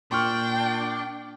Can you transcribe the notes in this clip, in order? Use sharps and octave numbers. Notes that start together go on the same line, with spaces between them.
A#2 D4 G5 C6 C#6 F6